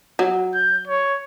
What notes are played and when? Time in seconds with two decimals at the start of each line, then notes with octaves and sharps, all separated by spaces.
0.19 F#3
0.55 G6
0.88 C#5